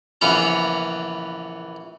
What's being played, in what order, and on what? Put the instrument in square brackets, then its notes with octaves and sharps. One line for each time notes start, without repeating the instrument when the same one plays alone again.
[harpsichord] A#1 C#3 E3 B3 C#4 A#5